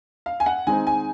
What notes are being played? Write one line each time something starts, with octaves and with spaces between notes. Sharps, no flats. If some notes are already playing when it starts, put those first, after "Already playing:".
F5
G#5
F#5
D#3 G#3 C4 D#4 G#5
G#5